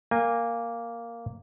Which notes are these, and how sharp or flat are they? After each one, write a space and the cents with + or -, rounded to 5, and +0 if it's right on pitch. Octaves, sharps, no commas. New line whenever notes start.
A#3 -5 G#5 -30